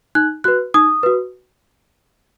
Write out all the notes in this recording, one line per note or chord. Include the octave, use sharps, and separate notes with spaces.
D#4 F#6
F#4 B4 F#6
D#4 D#6
F#4 B4